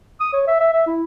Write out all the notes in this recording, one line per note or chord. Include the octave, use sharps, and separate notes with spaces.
D#6
C#5
E5
E5
E5
E4